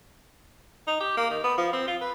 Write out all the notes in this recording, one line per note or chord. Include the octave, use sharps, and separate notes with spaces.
D#4
G4
A#3
D#3
B3
F3
C4
F4
B4